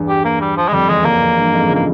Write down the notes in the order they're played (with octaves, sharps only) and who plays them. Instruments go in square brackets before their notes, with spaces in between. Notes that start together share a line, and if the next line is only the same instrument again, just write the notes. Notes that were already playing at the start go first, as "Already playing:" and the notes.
Already playing: [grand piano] E2 G2
[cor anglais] G4
A#3
G3
F3
G#3
[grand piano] F2 [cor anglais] G3
[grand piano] E2 [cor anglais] G#3
[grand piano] E2 [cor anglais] A#3
[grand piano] F2
E2 G2
F2 G#2
C#3 F3
[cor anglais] A#3